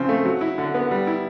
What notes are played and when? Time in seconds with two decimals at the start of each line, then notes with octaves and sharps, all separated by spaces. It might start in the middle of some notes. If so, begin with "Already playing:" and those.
Already playing: C#3 F3 C4
0.09 A3
0.25 F#3
0.41 E4
0.58 D3
0.74 B3
0.91 G3
1.07 E4